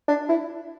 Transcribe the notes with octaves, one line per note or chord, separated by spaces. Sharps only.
D4
E4